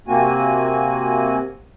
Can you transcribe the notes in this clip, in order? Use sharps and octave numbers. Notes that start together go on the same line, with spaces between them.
C3 A#3 C4 F#4 G#5